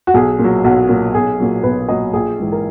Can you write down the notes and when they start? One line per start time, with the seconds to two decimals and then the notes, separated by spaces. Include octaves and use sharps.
0.07 F#4
0.14 B1 G#4
0.39 A#2
0.44 F#3
0.64 B1 F#4
0.89 A#2 F#3
1.14 B1 G#4
1.40 A#2 F#3
1.63 B1 B4
1.88 A#2 F#3 D#5
2.13 A#1 G#4
2.38 G#2 E3
2.52 A#4